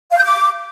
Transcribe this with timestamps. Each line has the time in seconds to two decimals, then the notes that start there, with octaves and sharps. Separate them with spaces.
0.11 F5
0.18 G6
0.24 D6